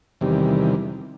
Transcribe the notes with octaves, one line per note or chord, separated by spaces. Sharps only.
E2 C3 D#3 G3